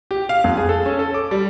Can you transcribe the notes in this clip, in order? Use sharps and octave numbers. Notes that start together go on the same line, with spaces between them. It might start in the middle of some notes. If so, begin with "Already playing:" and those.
G4
F5
F2
G#4
A4
C#4
A4
D6
G3